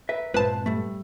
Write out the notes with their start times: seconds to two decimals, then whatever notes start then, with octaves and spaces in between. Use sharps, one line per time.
0.09 A#4 B4 E5
0.34 G2 A#2 G#3 C4 F4 B4 C5 A5
0.66 G3 A3